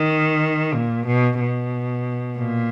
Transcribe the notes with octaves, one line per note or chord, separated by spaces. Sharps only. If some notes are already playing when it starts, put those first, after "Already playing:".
Already playing: D#3
A#2
B2
B2
A#2